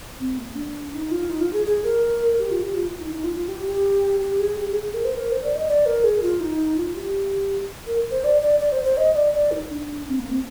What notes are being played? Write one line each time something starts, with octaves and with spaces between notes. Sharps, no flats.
C4
A#3
D4
D#4
F4
D#4
F4
G#4
G#4
A#4
G4
F4
G4
F4
D#4
D#4
F4
F4
G4
G4
G4
G#4
G4
G#4
G#4
A#4
C5
A#4
C5
D5
D#5
D5
A#4
G#4
F4
D#4
F4
G4
A#4
C5
D5
D5
D5
C5
C5
D#5
D5
D5
D#4
D4
C4
A#3
C4